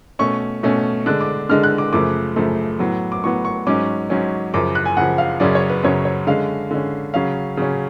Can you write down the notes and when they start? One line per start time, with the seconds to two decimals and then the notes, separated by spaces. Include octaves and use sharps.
0.19 B2 A3 C#4 C#6
0.63 B2 A3 C#4
1.06 D3 G#3 D4 F#6
1.21 D6
1.49 D3 G#3 D4 F6
1.63 F#6
1.78 D6
1.93 F#2 C#3 F3 A3 D6
2.36 F#2 C#3 F3 A3
2.79 A2 F#3 B3
3.12 D6
3.23 A2 F#3 B3 C#6
3.45 C#6
3.67 G#2 F#3 C#4 D6
4.10 G#2 F#3 C#4
4.54 F#2 C#3 F3 D6
4.75 F#6
4.86 G#5
4.97 F#2 C#3 F3 F#5
5.18 F5
5.40 F#2 C#3 F#3 C#4 D5
5.55 C#5
5.69 B4
5.83 F#2 C#3 F#3 C#4 C#5
6.05 C#5
6.27 D3 G#3 C#4 F5
6.71 D3 G#3 C#4
7.14 C#3 F#3 C#4 F5
7.57 C#3 F#3 C#4